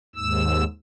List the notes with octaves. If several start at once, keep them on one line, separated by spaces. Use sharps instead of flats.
D#2 G#2 E6